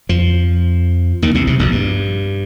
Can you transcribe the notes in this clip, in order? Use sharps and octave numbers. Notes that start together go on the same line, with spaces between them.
F2 F3
D#2 D#3
C2 C3
C2 C3
A#1 A#2
G2